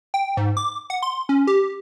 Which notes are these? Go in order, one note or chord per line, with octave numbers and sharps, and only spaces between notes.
G5
G#2
D6
F#5
C6
C#4
G4